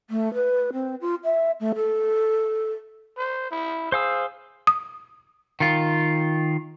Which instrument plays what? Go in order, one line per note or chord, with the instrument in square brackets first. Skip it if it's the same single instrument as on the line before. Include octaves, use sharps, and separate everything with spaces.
[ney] A3
B4
C4
F4
E5
A3
A4
[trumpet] C5
E4
[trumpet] G#4 [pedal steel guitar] C5 F5 E6
[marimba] D#6
[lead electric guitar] D#3 F4